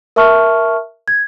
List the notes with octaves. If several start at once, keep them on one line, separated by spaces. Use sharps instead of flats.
A#4 E5 A5 C#6 F6
G#6